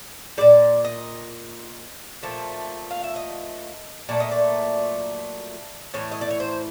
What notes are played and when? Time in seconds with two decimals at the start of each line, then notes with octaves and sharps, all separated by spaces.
0.38 A#2 G3 D5
0.85 D#5
2.23 A#2 F3 A3
2.91 F5
3.04 E5
3.16 D#5
4.09 A#2 F#3 A3 D5
4.20 D#5
4.31 D5
5.94 A2 E3 C#5
6.11 D#5
6.21 D5
6.31 C#5
6.40 C5